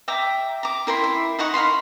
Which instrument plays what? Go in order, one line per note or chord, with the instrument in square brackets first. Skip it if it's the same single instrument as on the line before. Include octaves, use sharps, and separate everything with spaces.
[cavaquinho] E5 G5 A#5 D6
A#5 D6
E4 A#4 G5 C6
E4
D#4 F#5 A#5 C#6
A#4 F5 B5 C6